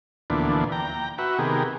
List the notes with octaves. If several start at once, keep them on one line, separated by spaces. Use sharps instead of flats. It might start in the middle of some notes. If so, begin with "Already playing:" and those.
D2 A#2 E3 F3 B3 D4
G5 A#5
F#4 B4 E5
C3 D#3 B3 G4 G#4 A#4